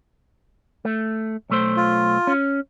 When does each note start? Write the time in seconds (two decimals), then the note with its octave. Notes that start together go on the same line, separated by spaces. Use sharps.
0.85 A3
1.50 B1 A3 C5
1.77 F4
2.27 C#4